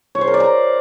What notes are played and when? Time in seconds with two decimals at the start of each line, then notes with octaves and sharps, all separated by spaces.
0.15 C#5
0.21 C5
0.28 A#4
0.34 D5
0.40 A#5